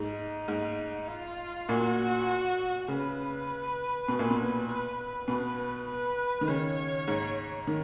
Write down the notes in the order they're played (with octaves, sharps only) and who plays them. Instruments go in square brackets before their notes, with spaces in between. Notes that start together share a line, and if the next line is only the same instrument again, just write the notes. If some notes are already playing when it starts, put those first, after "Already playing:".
Already playing: [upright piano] G#2 [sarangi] D#4
[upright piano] G#2
[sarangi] F4
[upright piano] A#2 [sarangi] F#4
[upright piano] C#3 [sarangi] B4
[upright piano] B2
A#2
B2
[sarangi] B4
B4
[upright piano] B2
[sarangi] B4
[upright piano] D#3
[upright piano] C#3 [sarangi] C#5
[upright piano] G#2
D#3